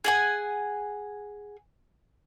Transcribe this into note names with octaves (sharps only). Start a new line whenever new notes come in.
G#4 F#5 G#5